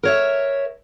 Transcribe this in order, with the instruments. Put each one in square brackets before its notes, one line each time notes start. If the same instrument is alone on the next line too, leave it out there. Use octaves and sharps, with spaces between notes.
[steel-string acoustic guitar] A#4 C#5 E5